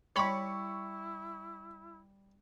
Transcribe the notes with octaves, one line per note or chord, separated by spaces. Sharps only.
G3 E4 C#5 B5 C#6 C#7